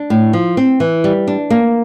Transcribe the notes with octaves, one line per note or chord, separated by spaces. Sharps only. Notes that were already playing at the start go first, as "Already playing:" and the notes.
Already playing: D4
A2
F3
C4
E3
G3
D4
A#3